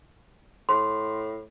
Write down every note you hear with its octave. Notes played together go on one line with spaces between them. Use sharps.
A2 C6